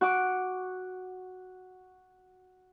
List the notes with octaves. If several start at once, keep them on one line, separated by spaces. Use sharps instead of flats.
F#4 F#5 D6